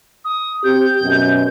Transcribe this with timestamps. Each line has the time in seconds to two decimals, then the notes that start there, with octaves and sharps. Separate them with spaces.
0.24 D#6
0.64 C4 G4 G6
1.02 F#2 B2